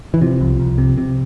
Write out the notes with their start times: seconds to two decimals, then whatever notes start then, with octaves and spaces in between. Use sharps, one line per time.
0.14 E3
0.21 C3 F3
0.40 C2
0.60 C2
0.78 C3
0.97 C3